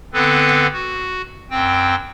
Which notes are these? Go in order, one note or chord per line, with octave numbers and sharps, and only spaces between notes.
D3 B3 C4 A4 B4
F#4
F#2 C4 G5